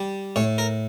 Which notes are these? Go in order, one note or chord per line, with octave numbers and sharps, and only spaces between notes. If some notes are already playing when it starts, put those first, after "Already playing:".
Already playing: G3
A2 C#5
A#4